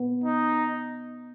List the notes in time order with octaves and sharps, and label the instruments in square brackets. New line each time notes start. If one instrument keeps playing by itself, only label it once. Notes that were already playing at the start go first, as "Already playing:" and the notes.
Already playing: [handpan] B3
[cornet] D#4